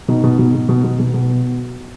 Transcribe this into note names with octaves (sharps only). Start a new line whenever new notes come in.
B2 D#4
B2
B2
B2
B2
B2
B2
B2